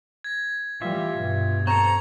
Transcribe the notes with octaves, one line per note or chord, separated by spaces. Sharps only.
G#6 A#6
E3 G3 F4 E5
G2 B2
C4 A4 A#5 C#6